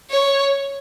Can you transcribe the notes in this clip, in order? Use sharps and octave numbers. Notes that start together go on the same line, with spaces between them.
C#5